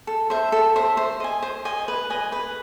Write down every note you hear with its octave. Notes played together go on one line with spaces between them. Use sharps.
A4
C5 E5
A4
C5 E5
C5
D#5 G#5
C5
D#5 G#5
B4
D#5 G#5
B4